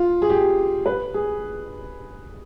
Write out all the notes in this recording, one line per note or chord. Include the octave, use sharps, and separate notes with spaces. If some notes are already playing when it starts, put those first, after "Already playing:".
Already playing: F4
G#4
G4
B4
G#4